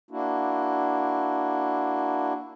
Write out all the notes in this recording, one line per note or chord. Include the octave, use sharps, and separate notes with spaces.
A#3 D4 E4 F#4